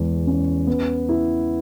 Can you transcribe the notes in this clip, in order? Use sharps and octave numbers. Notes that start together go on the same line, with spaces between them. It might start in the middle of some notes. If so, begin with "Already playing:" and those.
Already playing: E2 G#3
C#4
B3
E4